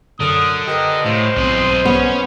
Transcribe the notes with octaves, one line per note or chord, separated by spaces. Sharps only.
F#2 D3 A4 A#4 D#6
G4 A#4 B4 D#5
A2 C5 C#5 F5
B1 C4 D#5
B3 C#4